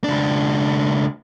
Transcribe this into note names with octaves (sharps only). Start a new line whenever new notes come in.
C#2 D4